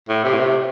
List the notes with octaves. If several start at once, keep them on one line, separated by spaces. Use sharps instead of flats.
A2
C3
A2
C3